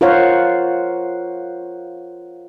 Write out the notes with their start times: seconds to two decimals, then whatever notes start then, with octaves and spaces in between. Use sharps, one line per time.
0.01 F4 A#4 C5 C#5 F5 F#5